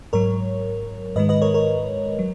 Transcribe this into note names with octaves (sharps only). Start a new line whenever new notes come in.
G#2 F#3 A#4 C#5
G#2 D#3 G#3 B4 D#5
B4 D#5
A#4 C#5
A#4 C#5
F#3